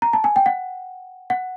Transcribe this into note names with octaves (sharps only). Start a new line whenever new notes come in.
A#5
A5
G#5
G5
F#5
F#5